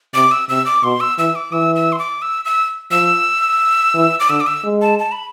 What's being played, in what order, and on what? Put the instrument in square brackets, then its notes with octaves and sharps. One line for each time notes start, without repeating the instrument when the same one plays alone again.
[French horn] C3 [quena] D6
[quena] E6
[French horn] C3 [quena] E6
[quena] D6
[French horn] B2 [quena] C6
[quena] E6
[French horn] E3 [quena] E6
[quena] D6
[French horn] E3 [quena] E6
[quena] E6
C6
D6
E6
E6
[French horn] F3 [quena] E6
[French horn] E3
[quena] D6
[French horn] D3 [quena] E6
[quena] D6
E6
[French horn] G#3
[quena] A5
A5
B5